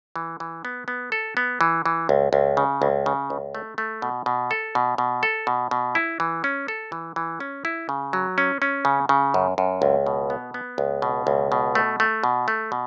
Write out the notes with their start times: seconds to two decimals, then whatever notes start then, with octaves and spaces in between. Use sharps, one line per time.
0.16 E3
0.40 E3
0.65 B3
0.88 B3
1.12 A4
1.37 B3
1.61 E3
1.86 E3
2.09 C#2
2.33 C#2
2.57 C#3
2.82 C#2
3.06 C#3
3.30 C#2
3.55 A3
3.78 A3
4.02 B2
4.26 B2
4.51 A4
4.75 B2
4.98 B2
5.23 A4
5.47 B2
5.71 B2
5.95 E4
6.20 E3
6.44 C#4
6.68 A4
6.92 E3
7.16 E3
7.40 C#4
7.65 E4
7.89 C#3
8.13 F#3
8.38 C#4
8.62 C#4
8.85 C#3
9.09 C#3
9.34 F#2
9.58 F#2
9.82 C#2
10.06 B2
10.30 B3
10.54 B3
10.78 C#2
11.02 B2
11.27 C#2
11.52 B2
11.75 A3
12.00 A3
12.24 B2
12.48 A3
12.72 B2